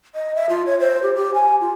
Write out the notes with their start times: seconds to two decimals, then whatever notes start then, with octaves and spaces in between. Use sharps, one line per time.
0.15 D#5
0.35 E5
0.49 F4
0.66 C#5
0.79 C5
1.02 G4
1.14 G4
1.34 G#5
1.61 F4